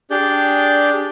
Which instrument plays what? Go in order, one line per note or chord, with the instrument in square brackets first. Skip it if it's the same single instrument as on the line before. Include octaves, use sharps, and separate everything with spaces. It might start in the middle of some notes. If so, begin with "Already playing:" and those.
[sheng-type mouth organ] D4 G4 G#4 D5 G6